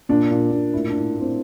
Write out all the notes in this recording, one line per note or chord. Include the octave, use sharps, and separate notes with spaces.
A#2 D4
A#2
A#2
A2 E4
D4
A2
A2 C4